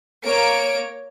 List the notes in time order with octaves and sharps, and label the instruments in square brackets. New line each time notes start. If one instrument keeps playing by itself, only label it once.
[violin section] A#3 C#5 D7